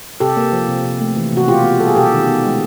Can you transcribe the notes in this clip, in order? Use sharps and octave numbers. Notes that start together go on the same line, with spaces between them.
C3 G4 A4
A#3
F3
C3
C3
A3
E3
C3 F#4
B2 F4 G4
B3
G3 A4
G#4
B2 G4 A4
D#3
B3
G#3